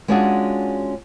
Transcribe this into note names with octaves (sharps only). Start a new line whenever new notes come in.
G#3 C#4 D4 F4 F#4 G#4